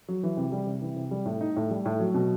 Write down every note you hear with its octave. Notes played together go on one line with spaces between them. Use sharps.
F#3
E3
C3
G3
C3
E3
C3
G3
A2
D#4
A2
G3
A2
F#3
B2